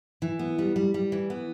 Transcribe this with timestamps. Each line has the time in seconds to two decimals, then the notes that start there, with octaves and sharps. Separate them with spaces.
0.22 E3
0.39 B3
0.58 G3
0.76 G3
0.94 G3
1.12 E3
1.30 B3